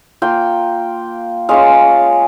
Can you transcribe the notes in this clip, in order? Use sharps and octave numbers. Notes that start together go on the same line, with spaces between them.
A#3 F4 G5
G#3 C#4 F4 F5